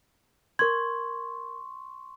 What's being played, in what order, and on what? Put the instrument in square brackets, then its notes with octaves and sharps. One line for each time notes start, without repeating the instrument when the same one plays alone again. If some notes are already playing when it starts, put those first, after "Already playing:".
[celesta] A#4 G#6 [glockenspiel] C6 C#6